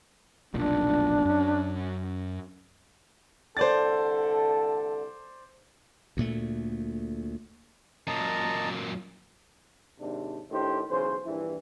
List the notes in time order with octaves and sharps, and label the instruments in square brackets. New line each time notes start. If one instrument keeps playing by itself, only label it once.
[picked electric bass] F1 B1 A#2 [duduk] D4
[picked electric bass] F#2 C#4
[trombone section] C2 D3 A4 [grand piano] C5 D5 A6
[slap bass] D2 A#2 A3
[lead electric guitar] F#2 A#2 [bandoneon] D#5 A5 A#5
[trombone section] D#2 G#2 C3 D4
A2 D#3 D4 G4 C5
B1 C#3 E3 C5
A#1 G2 E3